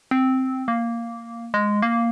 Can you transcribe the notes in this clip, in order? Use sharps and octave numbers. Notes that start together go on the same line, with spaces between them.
C4
A#3
G#3
A#3